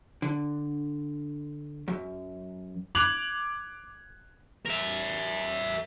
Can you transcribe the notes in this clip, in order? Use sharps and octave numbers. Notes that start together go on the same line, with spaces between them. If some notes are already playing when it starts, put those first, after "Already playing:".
D3
F#2
D6 F#6 G#6 F7 F#7
A#4 E5